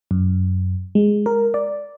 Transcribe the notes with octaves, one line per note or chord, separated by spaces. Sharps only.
F#2
G#3
A#4
D5